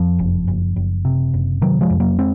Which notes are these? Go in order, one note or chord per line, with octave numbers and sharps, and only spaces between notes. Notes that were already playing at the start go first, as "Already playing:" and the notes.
Already playing: F2 F3
F#1
F#1
F#1
C3
F#1
C3 D#3 F#3
F3 G#3
F2
F#3 A#3
G#3 C4